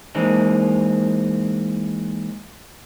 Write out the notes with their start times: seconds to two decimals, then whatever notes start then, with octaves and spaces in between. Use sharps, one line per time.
0.15 E3 G#3 A#3 C4 D#4